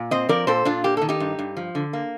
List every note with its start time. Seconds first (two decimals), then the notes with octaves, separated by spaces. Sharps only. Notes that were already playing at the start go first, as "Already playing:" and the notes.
Already playing: A#2
0.11 C4 C5 D#5
0.29 F3 A#4 D5
0.47 A#2 A4 C5
0.65 A#2 D4 F4
0.84 A#3 G4
0.97 D#3 A4
1.09 D#4 G4
1.20 G2
1.39 G2
1.57 F3
1.75 D3
1.93 A#3